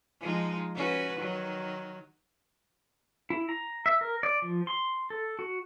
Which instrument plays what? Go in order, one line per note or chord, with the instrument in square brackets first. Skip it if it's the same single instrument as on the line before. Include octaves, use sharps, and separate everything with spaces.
[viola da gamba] F3 G#3 D#4
C#4 F#4 B4
D#3 F#3
[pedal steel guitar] E4
A#5
E5
A#4
D5
F3
C6
A4
F#4